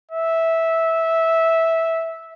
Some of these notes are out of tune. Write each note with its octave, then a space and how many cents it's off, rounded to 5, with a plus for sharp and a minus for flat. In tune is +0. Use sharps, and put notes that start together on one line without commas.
E5 -10